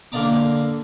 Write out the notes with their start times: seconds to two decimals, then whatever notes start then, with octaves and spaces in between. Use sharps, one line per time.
0.12 D3 A#3 D5 A#5 D6